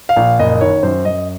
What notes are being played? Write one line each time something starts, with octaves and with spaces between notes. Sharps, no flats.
F5
A#1
F#1 D#5
D#3 C#5
F#2 C5
F#2 D#5